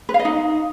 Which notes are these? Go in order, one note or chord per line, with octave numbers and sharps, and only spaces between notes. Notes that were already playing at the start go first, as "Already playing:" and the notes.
B4
F5
D#5
D#4